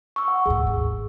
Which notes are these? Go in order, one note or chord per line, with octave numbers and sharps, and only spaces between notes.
C#6 E6
F#5
D2 G#2 G#4
G#1 D#2